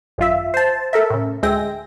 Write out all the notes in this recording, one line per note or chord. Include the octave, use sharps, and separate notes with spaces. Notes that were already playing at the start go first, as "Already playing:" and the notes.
G#1 F#2 F4 E5
C5 A5
A4 A#4 E5
A2 C#3
D2 G#3 G#4 E5 G5 A#6